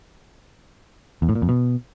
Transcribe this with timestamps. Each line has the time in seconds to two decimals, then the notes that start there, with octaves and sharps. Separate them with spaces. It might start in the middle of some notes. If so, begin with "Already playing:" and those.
1.22 E2
1.29 A2
1.35 A#2
1.42 F2
1.49 B2